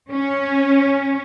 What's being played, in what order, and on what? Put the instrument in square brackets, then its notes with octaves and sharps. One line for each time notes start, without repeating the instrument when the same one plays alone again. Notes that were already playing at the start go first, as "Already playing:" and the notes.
[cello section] C#4